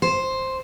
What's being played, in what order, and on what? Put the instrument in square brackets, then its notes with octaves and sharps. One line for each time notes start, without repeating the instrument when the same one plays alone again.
[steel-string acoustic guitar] C5